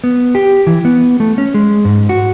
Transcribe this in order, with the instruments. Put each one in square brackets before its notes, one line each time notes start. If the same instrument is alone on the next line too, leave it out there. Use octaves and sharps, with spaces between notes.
[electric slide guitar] B3
G4
E3
B3
A3
C#4
G#3
G#2
F#4